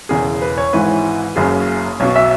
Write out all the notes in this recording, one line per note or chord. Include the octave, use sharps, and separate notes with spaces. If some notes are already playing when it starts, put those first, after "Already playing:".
E1 E2 C#3 G#4
B4
C#5
G#1 G#2 E3 B4
F#1 F#2 C#3 G#4
B1 B2 C#5
E5